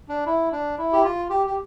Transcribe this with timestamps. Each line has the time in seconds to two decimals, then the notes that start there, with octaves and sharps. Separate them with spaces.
0.09 D4
0.26 E4
0.52 D4
0.78 E4
0.93 G4
1.04 F4
1.30 G4
1.47 G4